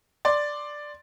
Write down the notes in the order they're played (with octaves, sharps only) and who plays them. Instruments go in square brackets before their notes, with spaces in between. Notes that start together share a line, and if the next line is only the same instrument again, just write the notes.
[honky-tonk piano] D5 C6 A6